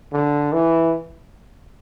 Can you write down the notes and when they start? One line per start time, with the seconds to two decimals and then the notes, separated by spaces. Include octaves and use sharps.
0.13 D3
0.52 E3